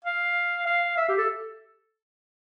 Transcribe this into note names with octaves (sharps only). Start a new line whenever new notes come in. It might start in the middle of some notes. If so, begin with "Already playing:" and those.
F5
F5
E5
G4
A4